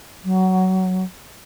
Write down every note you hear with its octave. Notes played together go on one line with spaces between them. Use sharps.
F#3